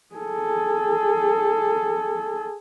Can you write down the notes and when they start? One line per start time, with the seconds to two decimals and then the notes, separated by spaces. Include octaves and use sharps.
0.15 G#4 A4